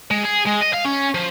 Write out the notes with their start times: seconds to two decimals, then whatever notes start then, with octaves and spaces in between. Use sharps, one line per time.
0.11 G#3
0.25 G#4
0.47 G#3
0.62 D#5
0.74 F5
0.85 C#4
1.15 F3